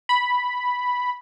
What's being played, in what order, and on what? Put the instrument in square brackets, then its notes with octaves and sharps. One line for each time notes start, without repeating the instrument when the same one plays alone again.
[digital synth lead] B5